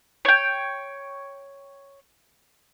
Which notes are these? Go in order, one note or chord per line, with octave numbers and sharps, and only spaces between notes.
C#5 G5